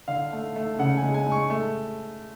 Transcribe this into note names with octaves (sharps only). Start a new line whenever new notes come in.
D3 F5
A3
A3
C#3 F#5
G#5
G#3
G#5
G#3
C#6
A3